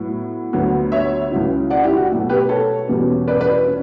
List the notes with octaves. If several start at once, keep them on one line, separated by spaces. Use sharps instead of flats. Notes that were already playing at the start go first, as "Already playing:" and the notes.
Already playing: A2 F#3 B3
D2 D3 F#3 B3
C#5 E5
C#2 C#3 F#3 C#4 E4
D5 F#5
E4 G4
F#4
B2 F#3 A3
G4 B4
A4 C#5
E2 B2 G3 C#4
B4 D5
B4 D5
C#4